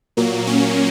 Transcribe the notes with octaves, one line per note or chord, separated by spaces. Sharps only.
A#2 F#3 A#3
C#4